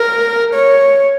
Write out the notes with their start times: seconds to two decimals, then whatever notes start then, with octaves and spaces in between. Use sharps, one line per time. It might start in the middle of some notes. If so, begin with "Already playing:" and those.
Already playing: A#4
0.54 C#5